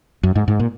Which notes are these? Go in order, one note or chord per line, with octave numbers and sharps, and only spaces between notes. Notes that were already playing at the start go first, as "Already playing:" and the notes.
F#2
G#2
G#2
A#2